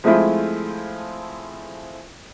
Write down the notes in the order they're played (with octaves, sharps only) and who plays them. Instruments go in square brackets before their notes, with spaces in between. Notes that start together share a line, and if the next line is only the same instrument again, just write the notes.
[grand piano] F3 G#3 A3 C4 E4 F4